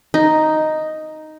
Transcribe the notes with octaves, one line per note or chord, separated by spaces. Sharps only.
D#4